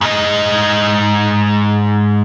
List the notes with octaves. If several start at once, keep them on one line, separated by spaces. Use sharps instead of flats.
G#2 D#5